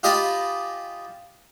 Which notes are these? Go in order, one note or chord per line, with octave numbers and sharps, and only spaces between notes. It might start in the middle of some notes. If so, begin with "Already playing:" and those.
F4 G4 D#5 G#5 A5 B5